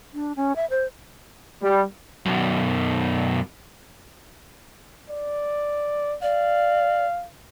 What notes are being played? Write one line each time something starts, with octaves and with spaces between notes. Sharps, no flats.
D4
C#4
E5
C5
G3
B1 F#2
D5
D5 F5